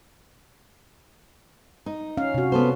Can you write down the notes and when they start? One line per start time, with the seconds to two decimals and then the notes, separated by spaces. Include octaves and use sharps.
1.86 D#4
2.17 C#4 F5
2.34 C3 F#4
2.52 B3 A4 C5